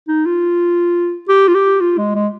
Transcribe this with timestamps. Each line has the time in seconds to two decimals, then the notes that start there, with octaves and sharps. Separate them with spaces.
0.08 D#4
0.26 F4
1.29 G4
1.48 F4
1.55 G4
1.81 F4
1.98 G#3
2.15 G#3